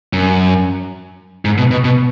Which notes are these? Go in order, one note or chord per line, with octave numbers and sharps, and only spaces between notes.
F#2
G#2
B2
B2
B2